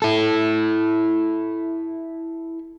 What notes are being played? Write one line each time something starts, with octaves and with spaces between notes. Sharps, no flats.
E4 A4